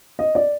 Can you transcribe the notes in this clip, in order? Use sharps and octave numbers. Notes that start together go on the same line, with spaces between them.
D#5
D5